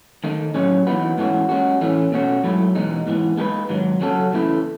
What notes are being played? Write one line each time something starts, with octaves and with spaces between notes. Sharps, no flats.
D#3 A3 D#4
A2 F#3 C#4 G#4 C#5
E3 B3 D#4 F#4 B4
G#2 E3 A3 C#4 F#4
G#3 C#4 F#4
A2 E3 A3 C#4
B2 A3 C#4 F#4
G#2 F#3 A3 E4
E2 B2 G#3 D#4
G#2 E3 B3
G#3 D#4 G#4 B4
G#2 D#3 F#3
C#3 F#3 C#4 F#4 A4
E2 C#3 E3 A3 E4